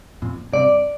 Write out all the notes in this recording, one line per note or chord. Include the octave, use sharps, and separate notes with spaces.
F2 A#2
G2 C3 D5